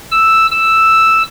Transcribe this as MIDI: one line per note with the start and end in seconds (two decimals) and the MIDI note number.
0.11 0.47 88
0.51 1.23 88